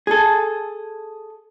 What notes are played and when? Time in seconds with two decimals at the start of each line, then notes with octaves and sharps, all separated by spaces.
0.07 G#4 A4